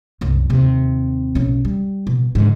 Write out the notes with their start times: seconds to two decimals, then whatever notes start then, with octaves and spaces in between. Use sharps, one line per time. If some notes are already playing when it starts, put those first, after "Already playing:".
0.21 C2 F#2
0.50 D#2 C3
1.35 B1 C#4
1.65 G3
2.07 B2
2.35 G#2 D3